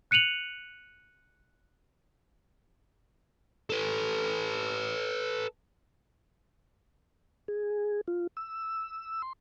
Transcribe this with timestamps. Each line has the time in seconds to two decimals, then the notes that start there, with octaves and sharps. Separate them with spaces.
0.11 F#6 C#7 D#7 F7 F#7
3.70 A4 B4
7.48 G#4
8.08 F4
8.37 E6
9.22 C6